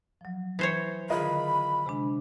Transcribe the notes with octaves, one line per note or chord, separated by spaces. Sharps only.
F3 F#3
E3 C5 C#5
D3 D#3 F4 G#4 A#4 D#5 B5
C3 G#3 D4